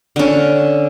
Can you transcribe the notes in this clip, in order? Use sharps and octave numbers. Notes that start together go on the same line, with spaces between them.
D3 C#4